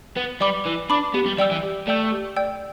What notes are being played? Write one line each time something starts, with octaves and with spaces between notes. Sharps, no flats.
B3 B4
G3 D5 B5 D6
E3 B4
D4 D5 B5 D6
B3 G4
G3
G3 D5 G5 E6 G6
E3
G4
A3 D5 G5 E6 G6
G4
D5 G5 E6 G6